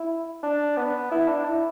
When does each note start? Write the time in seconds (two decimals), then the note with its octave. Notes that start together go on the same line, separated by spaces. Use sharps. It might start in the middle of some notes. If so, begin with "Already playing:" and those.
Already playing: E4
0.43 D4
0.77 B3
1.11 E4
1.28 D4
1.45 E4